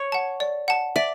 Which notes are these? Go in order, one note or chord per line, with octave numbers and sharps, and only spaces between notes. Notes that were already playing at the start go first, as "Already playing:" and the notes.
Already playing: C#5
F#5 A5
D5
F#5 A5
D5 E5